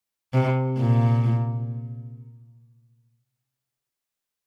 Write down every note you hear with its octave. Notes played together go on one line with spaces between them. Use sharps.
C3
A#2